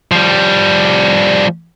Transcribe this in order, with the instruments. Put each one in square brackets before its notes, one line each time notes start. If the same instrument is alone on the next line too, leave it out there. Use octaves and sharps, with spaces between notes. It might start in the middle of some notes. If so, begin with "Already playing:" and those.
[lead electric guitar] F3 G3